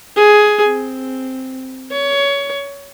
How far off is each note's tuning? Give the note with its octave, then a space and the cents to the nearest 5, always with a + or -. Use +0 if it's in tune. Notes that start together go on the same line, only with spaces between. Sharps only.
G#4 +10
C4 -5
C#5 +20